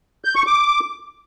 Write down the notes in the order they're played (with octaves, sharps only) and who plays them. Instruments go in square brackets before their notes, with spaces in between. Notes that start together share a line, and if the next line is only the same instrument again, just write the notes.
[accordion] G6
C#6
D6